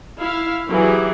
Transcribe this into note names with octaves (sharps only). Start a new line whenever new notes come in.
E4 F5
E3 F#3 G4 G#4